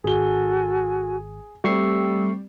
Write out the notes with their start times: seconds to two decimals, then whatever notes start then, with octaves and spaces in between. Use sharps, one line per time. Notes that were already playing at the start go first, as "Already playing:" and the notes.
0.04 G#1 F#4 G#4 A4 G#5 G7
1.64 G3 A3 C4 G4 C#6 E6 C7